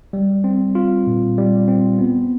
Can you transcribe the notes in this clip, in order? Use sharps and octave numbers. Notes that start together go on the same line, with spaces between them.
G3
C4
F4
A#2
G3
C4
B3